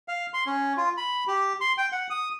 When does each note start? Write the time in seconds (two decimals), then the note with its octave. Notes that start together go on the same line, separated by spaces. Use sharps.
0.08 F5
0.34 C6
0.46 C#4
0.77 F4
0.97 B5
1.27 G4
1.61 C6
1.78 G5
1.92 F#5
2.10 D#6